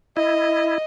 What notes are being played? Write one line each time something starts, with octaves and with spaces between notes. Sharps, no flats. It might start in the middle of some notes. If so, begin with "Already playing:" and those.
E4 D#5